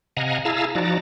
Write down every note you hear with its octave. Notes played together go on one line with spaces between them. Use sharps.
C3 D#5 F5 F#5 G#5 A#5
E4 G#4 F5 A5 A#5 E6
F3 D#4 F#4 D5 A5 A#5